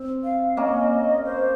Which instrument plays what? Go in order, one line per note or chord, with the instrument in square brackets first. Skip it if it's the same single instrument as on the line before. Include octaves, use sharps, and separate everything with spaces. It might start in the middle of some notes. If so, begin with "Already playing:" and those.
Already playing: [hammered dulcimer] C4
[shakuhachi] F5
[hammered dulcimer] A#3 C#4 [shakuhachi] D#5
[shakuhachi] C5